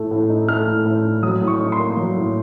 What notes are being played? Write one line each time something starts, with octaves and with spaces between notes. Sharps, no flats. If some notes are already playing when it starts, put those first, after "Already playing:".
Already playing: A2 A3
A2
D#4
A3 F6
A2
A2
D#4
F#3 D#6
A2
C#6
D#4
C6
A#3
F#3
A2